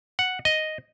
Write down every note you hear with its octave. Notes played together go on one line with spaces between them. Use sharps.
F#5
D#5